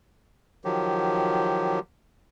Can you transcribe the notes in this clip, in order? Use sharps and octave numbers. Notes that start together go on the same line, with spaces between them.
D#3 F3 F#3 G4